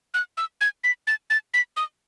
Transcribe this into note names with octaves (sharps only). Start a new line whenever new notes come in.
F#6
E6
G#6
B6
A6
A6
B6
D#6